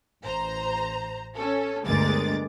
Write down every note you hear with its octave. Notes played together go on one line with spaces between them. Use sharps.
A1 C5 A#5
C#4 A4
G1 D2 G#3 A#4 D6 A6